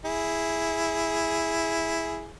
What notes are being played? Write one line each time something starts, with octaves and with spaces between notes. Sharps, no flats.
E4 G#4